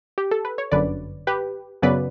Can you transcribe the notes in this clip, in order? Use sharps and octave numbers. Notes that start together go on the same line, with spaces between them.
G4
A4
B4
C#5
G1 F#2 D3 B4 D5
G4 B4
F#2 C#3 F#3 B3 B4 D5